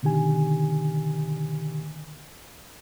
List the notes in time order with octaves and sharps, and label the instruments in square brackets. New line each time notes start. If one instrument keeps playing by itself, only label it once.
[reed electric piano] B2 D3 D#3 G4 G#5